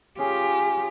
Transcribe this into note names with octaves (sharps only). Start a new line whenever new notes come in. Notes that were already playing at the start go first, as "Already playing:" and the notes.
C#4 F4 G4 G#4